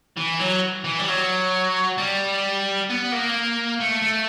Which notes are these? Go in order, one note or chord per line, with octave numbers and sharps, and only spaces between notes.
E3
F#3
E3
G3
F#3
G3
B3
A#3
A3
A3